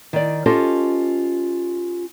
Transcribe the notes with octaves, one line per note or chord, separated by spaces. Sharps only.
D#3 D5
C#4 F4 G4 A4 C5 D#5